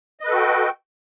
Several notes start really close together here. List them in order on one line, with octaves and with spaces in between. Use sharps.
D#5 B4 A4 F#4 G5